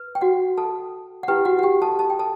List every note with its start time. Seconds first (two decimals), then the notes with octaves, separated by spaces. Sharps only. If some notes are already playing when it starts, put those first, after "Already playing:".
Already playing: B4
0.15 G5
0.21 F#4 F#5
0.57 A4 A5
1.23 F#5
1.28 E4 G4 B4 G5
1.45 F#4 F#5
1.59 F#5
1.63 G4 G5
1.82 A4 A5
1.99 A5
2.10 G5
2.19 A4 A5